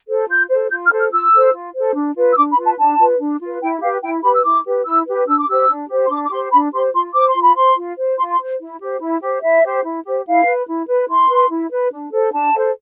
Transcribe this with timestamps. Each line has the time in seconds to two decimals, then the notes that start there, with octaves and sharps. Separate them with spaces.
0.08 A4 C5
0.29 F4 G6
0.50 A4 C5
0.71 F4 G6
0.85 F6
0.91 A4 C5
0.99 F6
1.12 F4 E6
1.33 A4 C5
1.53 F4
1.75 A4 C5
1.95 D4
2.16 F4 B4
2.32 E6
2.36 D4 D6
2.50 B5
2.57 F4 B4
2.65 A5
2.78 D4 A5
2.98 F4 B4
3.19 D4
3.41 F4 B4
3.62 E4 G5
3.81 G4 F5
3.85 B4
4.02 E4 G5
4.23 G4 B4 B5
4.35 E6
4.44 E4 D6
4.65 G4 B4
4.85 E4 E6
5.06 G4 B4
5.28 D4 E6
5.39 D6
5.48 G4 C5 E6
5.69 D4
5.89 G4 C5
6.06 C6
6.10 D4 D6
6.25 D6
6.31 G4 C6
6.35 C5
6.51 D4 B5
6.73 G4 C5 C6
6.93 F4 C6
7.14 C5 D6
7.28 C6
7.35 F4
7.42 B5
7.55 C5 C6
7.77 F4
7.97 C5
8.18 F4 C6
8.31 C6
8.39 C5
8.60 E4
8.81 G4 C5
9.00 E4
9.21 G4 C5
9.42 E4 E5
9.63 G4 C5
9.84 E4
10.04 G4 C5
10.26 E4 F5
10.46 B4
10.68 E4
10.88 B4
11.09 E4 C6
11.29 B4
11.49 E4
11.70 B4
11.92 D4
12.12 A4 C5
12.33 D4 A5
12.54 A4 C5